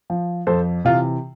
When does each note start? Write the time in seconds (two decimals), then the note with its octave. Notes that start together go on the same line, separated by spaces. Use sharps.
0.10 F3
0.47 F2 A4 C5
0.85 C3 E3 F4